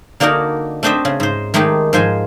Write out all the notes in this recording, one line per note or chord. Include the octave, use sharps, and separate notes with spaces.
D3 A#3 D4 D#4 F#4 A#4
A3 C4 D4 C5 D#5 E5
C#3
G#2 C5
D#3 G#3 A3 D#4 G4
G#2 F3 C5 G#5